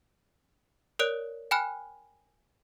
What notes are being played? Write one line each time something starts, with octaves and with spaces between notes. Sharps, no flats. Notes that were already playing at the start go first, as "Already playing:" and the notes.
A#4 C#5 D5 F#6 D7
G5 G#5 B5 F6 F#6